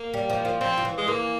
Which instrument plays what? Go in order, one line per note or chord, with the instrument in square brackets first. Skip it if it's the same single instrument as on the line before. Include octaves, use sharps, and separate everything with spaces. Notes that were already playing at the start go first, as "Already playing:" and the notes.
Already playing: [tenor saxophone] A#3
[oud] G3
F3
F3
[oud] F3 [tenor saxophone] C4
[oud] F3
E3
[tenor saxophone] G#3
[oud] E3 [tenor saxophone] A#3